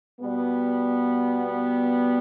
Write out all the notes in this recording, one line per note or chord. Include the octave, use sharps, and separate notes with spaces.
B2 G3 B3